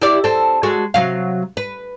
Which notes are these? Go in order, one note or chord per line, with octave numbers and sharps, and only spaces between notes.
E4 G4 D5
C4 A4
G#3 F#4 A4
C3 F#3 F5
B4